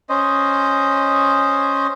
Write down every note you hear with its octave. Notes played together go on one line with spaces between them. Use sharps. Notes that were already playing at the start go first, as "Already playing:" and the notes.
C#4 C5 D#5